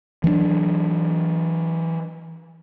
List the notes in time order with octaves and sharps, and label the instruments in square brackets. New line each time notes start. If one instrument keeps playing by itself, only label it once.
[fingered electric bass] E3 F#3 C4 D4